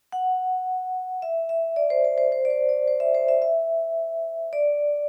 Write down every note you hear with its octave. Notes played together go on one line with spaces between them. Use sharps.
F#5
E5
E5
D5
C5
C5
C5
C5
D5
C5
D5
C5
E5
C5
E5
E5
D5